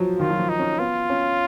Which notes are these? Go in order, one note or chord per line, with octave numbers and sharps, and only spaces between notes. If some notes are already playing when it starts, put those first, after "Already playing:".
Already playing: F3 F#3
D#3 F4
F#3
F3
D#4
C#4
B3 F4
C#4